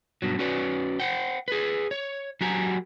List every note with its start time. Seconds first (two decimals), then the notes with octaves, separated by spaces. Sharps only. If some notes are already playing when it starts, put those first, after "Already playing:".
0.22 G2 B2 F#3
0.39 C#4 F#4 B4 C#5 D5
1.00 C5 F#5 G5
1.48 G#4 B4
1.91 C#5
2.41 F#3 F#4 G4 A#4 G#5 A#5